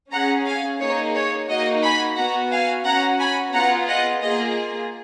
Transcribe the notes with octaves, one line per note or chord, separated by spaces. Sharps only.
C#4 G#4 F#5 A#5
F5 G#5
A#3 D#4 G#4 C#5
C#5
A#3 D#4 F#4 D#5
G#5 B5
B3 F#4 F#5 A#5
F5 G#5
C#4 F#4 F#5 A#5
G#5 B5
B3 F4 G#4 F#5 A#5
D#5 F#5
A#3 F4 G#4 D#5